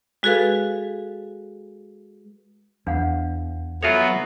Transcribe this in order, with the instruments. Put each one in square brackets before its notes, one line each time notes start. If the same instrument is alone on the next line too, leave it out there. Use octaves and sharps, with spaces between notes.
[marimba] G#3 F#4 G#4 A4 B4 F5
[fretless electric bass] E2 [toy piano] D4 F5 F#5
[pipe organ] F#3 B3 [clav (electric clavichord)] F4 F#4 C#5 [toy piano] A4 E5 G#5